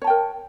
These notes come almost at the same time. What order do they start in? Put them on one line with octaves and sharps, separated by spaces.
C#5 A5 G5 A#4